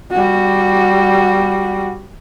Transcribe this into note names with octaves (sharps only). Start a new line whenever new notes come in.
G3 F#4